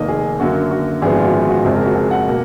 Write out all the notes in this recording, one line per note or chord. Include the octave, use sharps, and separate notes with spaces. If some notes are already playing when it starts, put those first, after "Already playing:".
Already playing: F1 D#2 D#3 A#3 D#5
G#4
F#2 D3 F#3 A#3 F#4
F#4
G#1 F#2 F3 G#3 B3 G#4
F4
F#4
F4
F#4
F#1 F2 F3 G#3 G#4
A#4
F#4
G#4
F#5
B2 A#3